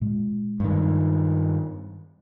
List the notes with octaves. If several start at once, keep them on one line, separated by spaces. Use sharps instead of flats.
A#2 G#3
G2 D#3